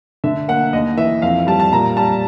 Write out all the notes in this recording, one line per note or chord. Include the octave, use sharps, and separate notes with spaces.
D3 E5
A#3 F#5
D#2 D#5
E3 E5
F2 F5
G3 A5
A5
A#2 A#5
G3 A5